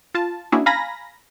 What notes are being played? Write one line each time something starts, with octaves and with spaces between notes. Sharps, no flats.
F4 A5
A#3 C#4 D4 E4 F#4 G#4
F5 G#5 A#5 B5 A#6